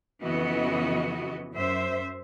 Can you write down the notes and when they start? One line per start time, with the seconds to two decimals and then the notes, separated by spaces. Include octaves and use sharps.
0.23 F2 C#3 E3 B3 F#4 D#5
1.53 F#2 C5 E5